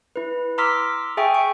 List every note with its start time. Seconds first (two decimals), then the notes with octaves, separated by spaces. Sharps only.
0.16 E4 B4
0.58 A#5 C6 D6 E6 F6 B6
1.17 G#4 E5 G5 G#5 C#6
1.34 C#6